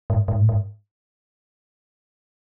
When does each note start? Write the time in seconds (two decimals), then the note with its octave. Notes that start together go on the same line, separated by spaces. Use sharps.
0.10 G#2
0.28 G#2
0.39 A2
0.49 G#2